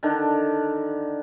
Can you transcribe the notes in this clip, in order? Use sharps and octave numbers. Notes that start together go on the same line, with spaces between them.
D3 D#3 D4